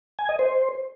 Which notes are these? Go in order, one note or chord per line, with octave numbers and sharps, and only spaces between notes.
G#5
D#5
C5